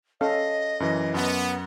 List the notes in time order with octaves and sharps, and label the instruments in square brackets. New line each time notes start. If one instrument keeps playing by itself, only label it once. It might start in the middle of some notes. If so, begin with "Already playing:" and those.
[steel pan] C#4 A4 F5 [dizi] D#5
[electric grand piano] F#2 E3
[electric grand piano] F#2 F#5 [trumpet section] B3